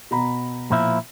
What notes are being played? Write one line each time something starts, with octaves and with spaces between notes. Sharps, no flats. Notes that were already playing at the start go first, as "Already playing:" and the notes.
B2 A#5 B5
A#2 F3 E4